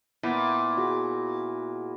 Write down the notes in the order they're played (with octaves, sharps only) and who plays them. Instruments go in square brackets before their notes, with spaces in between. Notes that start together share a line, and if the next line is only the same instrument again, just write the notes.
[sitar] A#2 [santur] B3 E4 B5
[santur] F#4 G#4